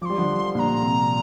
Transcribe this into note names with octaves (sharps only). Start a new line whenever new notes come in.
F3 D6
G3 C6
D3 F3
A#2 D3 A#5 C6
C3